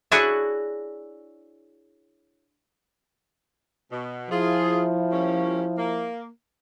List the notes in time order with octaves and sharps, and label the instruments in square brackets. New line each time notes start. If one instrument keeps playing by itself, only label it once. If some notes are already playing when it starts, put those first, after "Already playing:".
[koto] D4 E4 F#4 G#4 C#5 F#5
[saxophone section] B2
[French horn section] F3 E4 [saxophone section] F4 G#4
[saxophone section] G3 A#3 C#4
A#3